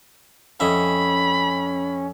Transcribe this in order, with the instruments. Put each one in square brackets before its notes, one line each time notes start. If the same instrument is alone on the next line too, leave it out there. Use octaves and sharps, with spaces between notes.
[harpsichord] F2 D#5 E5 [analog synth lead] C#4 [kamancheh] B5